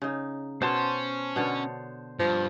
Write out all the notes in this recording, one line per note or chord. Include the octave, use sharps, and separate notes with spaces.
C#3 D#4
B2 C#4 C5 A5 C6
B2 D3 C#5
G2 F3